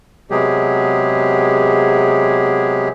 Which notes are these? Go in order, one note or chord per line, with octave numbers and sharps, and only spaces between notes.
C3 F#3 G#3 B3 G4 G#4